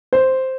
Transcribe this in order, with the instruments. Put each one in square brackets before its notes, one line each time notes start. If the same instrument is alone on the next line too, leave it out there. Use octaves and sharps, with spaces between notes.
[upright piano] C5